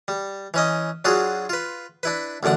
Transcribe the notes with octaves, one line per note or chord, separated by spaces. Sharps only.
G3
E3 C#4 D#5
F#3 D4 F4 F#4 G#4
F4 B4
D4 E4 B4
A1 F#2 D3 D5 F#5